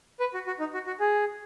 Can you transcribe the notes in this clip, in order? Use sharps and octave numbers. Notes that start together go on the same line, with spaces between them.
B4
F#4
F#4
D#4
F#4
F#4
G#4